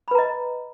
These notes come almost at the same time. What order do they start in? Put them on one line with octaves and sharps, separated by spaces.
B5 B4 A#5 D#5